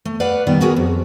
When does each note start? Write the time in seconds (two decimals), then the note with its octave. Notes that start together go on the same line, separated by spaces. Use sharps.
0.05 A3
0.20 B4 D5 F5 F#5
0.47 A#2 D#3 G3 B3
0.60 A#3 B3 F#4 G#4 A#4 B4
0.76 F2